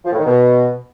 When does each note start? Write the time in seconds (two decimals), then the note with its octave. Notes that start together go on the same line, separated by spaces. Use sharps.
0.05 F3
0.12 A2
0.19 D#3
0.26 B2